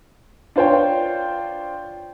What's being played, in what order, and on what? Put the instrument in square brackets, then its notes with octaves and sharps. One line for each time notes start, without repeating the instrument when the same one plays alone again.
[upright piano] D4 F4 C5 C#5 G5